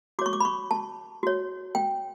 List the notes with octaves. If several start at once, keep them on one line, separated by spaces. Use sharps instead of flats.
F#4 C#5 C#6 D6
D6
B5
C#6
A5
F#4 C#5
G5